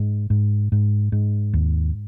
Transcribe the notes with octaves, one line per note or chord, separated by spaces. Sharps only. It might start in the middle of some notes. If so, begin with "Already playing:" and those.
Already playing: G#2
G#2
G#2
G#2
D#2